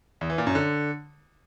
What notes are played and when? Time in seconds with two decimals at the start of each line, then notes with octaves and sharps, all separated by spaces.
0.21 E2
0.30 E3
0.38 A#2
0.47 F#2
0.55 D3